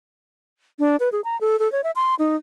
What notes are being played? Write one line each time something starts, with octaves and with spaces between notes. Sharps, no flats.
D4
B4
G#4
A#5
A4
A4
C#5
E5
C6
D#4